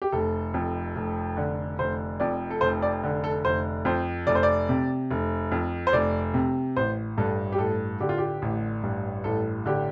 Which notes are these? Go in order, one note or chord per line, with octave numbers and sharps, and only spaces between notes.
G4
F1 A4
F2
F1
D3
F1 C5
F2 D5
A4
F1 C5
D5
D3
A4
F1 C5
F2 C5
F1 D5
C5
D5
C3
F1
F2
C5
F1 D5
C3
A1 C5
G2 A4
G4
A1 A4
D3 G4
F4
G4
A1
G2
A1 A4
D3 G4